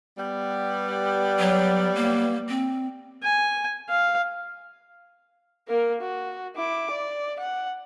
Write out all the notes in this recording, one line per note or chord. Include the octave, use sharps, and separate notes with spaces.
G3 B3
F#3
A#3
C4
G#5
F5
A#3 A#4
F#4
E4 D6
D5
F#5